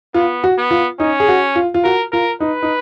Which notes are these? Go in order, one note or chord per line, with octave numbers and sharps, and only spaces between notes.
B3 F4
F#4
B3
F4
C#4 D#4
G#4
F#4
F4
F4
F#4 A#4
F4 A#4
D#4 B4
D#4